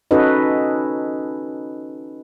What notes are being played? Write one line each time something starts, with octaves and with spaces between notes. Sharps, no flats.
C#4 D#4 F#4 A4 B4 D#5